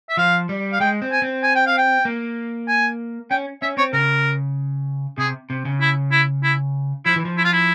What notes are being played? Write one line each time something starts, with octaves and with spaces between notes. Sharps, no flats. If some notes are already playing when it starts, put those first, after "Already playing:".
E5
F3 F5
G3
F5
G#3 G5
C4
G#5
C4
G#5
G5
F5
G5
A#3
G#5
C#4 G5
C#4 E5
C4 C#5
C#3 A#4
C3 G#4
C3
C#3
E4
E4
E4
F3 E4
E3
F3
E4
F4
E4